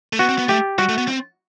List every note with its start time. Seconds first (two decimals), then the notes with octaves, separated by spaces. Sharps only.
0.13 A3
0.19 B3 F#4
0.29 C4
0.39 B3
0.48 A3 G4
0.78 G3 F#4
0.89 A3
0.98 B3
1.08 C4